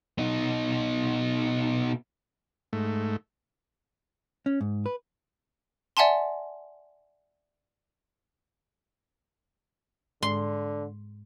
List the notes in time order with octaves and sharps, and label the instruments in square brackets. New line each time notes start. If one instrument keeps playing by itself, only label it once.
[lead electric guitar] B2 D#4
[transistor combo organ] G#2 A3
[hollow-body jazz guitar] C#4
G#2
B4
[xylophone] D5 E5 F#5 G#5 A5 C6
[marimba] G#2 G#3 [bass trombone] D3 [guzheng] C6